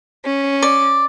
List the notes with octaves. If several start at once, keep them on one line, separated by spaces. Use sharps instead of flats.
C#4
D5